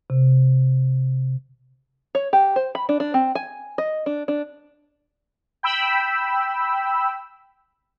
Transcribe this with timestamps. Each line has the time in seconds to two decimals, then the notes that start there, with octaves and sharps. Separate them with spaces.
0.10 C3
2.15 C#5
2.33 G4
2.56 C5
2.75 B5
2.89 D4
3.00 D4
3.14 C4
3.35 G#5
3.78 D#5
4.06 D4
4.28 D4
5.63 G5 B5 E6